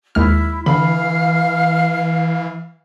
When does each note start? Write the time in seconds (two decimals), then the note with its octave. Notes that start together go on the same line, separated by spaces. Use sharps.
0.15 D#2 G#3 E4 F6
0.66 D3 E3 F5 B5 F6